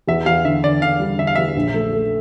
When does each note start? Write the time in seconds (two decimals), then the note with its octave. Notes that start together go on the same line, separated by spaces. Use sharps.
0.07 E2 E5
0.26 E2 F5
0.44 D3 E5
0.63 D3 D5
0.82 D3 F5
1.00 G3
1.19 D3 E5
1.27 F5
1.35 E2 E5
1.56 A#1
1.74 A3
1.93 A3